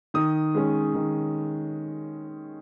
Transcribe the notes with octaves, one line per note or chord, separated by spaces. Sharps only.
D#3 D#6
G#3 C#4
D#3